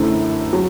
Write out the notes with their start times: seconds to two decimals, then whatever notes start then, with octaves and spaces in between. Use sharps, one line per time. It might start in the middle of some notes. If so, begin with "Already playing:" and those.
Already playing: F#2 D3 A3 C4 E4
0.53 F#3